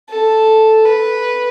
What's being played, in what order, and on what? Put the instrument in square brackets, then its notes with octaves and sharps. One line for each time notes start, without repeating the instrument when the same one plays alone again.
[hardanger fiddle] A4
B4